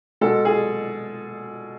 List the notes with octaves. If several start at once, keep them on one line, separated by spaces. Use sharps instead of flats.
B2 G#3 A4
G#4